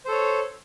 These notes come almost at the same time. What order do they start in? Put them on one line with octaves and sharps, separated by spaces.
C5 A4 C#5